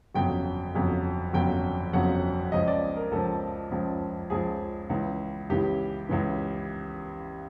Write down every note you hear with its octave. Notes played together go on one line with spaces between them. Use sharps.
G1 F2 C#3 F#3 G5
G1 F2 C#3 F#3
G1 F2 C#3 F#3 G5
G1 F2 C#3 F#3 F#5
C#2 C#3 F3 D#5
D5
A#4
C#2 C#3 F3 A4
C#2 C#3 F3
C#2 C#3 F3 G#4
C#2 C#3 E3
C#2 C#3 E3 G4
C#2 C#3 E3